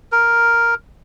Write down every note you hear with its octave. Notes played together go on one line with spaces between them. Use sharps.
A#4